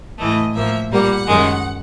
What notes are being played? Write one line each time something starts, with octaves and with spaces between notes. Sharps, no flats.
A2 E3 A3 D#5
A2 F3 A#3 E5
A#2 G3 A#3 F#5
F#2 D#3 G#3